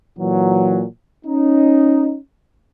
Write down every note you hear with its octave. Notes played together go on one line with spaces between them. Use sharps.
A#2 E3 F#3
C#4 D#4